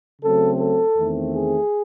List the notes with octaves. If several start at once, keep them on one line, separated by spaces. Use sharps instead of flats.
C#3 F#3 A3 C4 A4
A4
E2 D#3 A3 C4
G#4